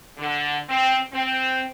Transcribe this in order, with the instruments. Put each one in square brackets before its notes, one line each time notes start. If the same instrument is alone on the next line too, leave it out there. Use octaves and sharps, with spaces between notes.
[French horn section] D3
C4
C4